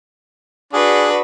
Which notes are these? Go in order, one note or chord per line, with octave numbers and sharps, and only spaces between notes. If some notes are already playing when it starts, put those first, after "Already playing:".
D4 F#4 G#4 B4